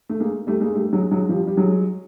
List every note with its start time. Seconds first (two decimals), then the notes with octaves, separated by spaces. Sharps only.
0.09 A3
0.20 G#3 A#3
0.47 G3 A3
0.60 G#3 A#3
0.74 G3 A3
0.93 F#3 G#3
1.11 F#3 G#3
1.29 F3 G3
1.47 G3
1.57 F#3 G#3